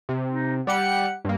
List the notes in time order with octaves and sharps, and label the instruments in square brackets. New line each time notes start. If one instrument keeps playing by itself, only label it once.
[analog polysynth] C3
[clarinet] D#4
[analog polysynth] G3 G4 C#7 [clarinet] F#5
[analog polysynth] G2 A#3